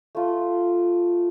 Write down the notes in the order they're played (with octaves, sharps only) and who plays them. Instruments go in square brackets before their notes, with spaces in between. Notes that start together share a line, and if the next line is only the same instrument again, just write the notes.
[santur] A3 F4